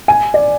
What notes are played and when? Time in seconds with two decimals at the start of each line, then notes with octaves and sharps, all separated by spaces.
0.08 G#5
0.34 D5